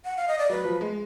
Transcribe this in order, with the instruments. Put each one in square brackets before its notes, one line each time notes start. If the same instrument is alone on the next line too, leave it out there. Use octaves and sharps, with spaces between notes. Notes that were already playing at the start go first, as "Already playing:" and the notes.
[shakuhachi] F#5
F5
D#5
D5
[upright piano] F#3 [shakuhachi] B4
[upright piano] F3
G#3